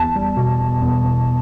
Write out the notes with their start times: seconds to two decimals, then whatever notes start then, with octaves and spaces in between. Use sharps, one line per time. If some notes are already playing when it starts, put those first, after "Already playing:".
Already playing: E2 A5
0.16 G3
0.37 B2
0.60 E2
0.82 E2
1.04 E2